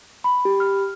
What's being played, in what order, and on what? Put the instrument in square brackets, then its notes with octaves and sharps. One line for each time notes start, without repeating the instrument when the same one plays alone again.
[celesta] B5
[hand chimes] G4
F6